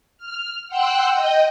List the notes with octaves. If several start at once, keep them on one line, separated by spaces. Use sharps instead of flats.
F6
F#5 G5 C6 E6 F#6
D#5 G5